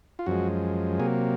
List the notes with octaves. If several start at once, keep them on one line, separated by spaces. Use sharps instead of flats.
F4
F#2 F3 G#3 F#4
C3 F#3 A#3 G#4